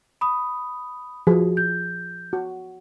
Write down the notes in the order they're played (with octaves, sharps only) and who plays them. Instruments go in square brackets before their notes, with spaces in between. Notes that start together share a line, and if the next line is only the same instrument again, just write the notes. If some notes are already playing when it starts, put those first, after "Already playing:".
[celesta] B5 D#6
[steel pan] F3 G#4 [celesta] F#4
[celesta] G6
[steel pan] F#4